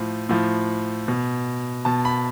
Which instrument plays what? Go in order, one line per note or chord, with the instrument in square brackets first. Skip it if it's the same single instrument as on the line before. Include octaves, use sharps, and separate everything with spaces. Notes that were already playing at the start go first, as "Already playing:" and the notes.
Already playing: [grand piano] A2 F3
A2 F3
B2
B2 A5
B5